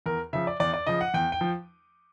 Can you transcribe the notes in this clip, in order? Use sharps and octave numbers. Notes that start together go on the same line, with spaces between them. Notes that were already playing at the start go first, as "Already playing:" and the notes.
E2 A#4
C#3 F3 E5
D5
E2 D5
D5
C#3 F3 D#5
F#5
E2 G5
G5
F3